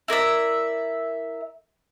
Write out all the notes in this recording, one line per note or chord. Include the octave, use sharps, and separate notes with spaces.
E4 A#4 D5 E5